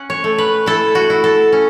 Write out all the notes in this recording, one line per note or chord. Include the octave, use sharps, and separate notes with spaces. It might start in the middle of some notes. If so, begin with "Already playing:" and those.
Already playing: C#4 F#5
C#5
A3
B4
E4 A4
F#4
E4
A4
C#4